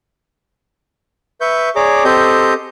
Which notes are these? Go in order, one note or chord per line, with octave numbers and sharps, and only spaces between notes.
B4 E5 C#6 G6
G#4 C#5 D5 A#5 D6
C4 G4 A4 D#5 G6